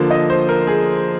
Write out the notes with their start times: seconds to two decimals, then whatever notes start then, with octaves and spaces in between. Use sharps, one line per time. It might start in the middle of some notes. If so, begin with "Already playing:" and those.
Already playing: D3 F3 A#3
0.11 D#5
0.30 C5
0.49 A#4
0.67 G#4